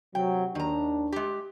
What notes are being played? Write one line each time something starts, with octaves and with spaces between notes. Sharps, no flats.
C3 F#3 G5
D#2 D#3 D4 A#5
G#3 G4